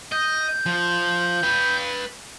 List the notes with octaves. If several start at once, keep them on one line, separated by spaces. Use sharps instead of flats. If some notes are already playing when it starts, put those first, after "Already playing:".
D#5 G6
F3
B4 G5